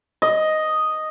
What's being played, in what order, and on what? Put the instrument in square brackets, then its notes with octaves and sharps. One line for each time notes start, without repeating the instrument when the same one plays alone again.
[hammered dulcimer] D#5